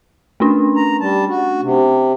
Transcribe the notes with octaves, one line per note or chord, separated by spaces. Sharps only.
A3 C#4 D4
A#5
G3 A5
F#4
C3